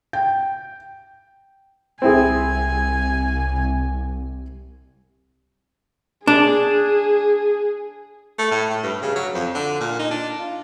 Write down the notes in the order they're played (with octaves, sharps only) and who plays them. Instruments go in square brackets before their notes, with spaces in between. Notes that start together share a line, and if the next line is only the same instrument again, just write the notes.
[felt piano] G5
[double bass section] C2 [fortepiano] C4 E4 G#4 [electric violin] G#5
[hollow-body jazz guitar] D4 [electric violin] G#4
[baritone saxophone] A3
A2
A2
G2
C#3
F#3
F2
D3
A#2
D#4
D4
F4